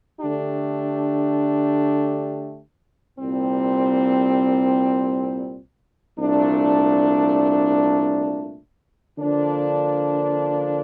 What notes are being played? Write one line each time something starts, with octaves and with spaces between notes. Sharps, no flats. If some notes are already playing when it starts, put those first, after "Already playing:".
D3 A3 D4 G4
C2 A#2 G3 C4
C2 A#2 A3 D4
D3 F3 A#3 D4